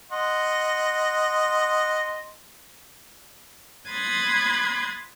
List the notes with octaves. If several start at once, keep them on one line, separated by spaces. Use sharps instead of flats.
D#5 F#5 C6
B5 C6 D#6 F#6 G#6 A6